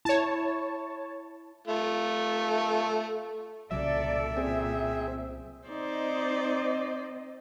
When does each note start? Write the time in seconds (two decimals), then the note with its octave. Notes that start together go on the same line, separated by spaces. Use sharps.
0.05 E4 C#5 A5
1.67 A3 F4
3.71 C2 A#2 C#3 F#3 A4 D5 E5
4.37 A#2 C4 G#4
5.69 C4 D#4 C5 D5 D#5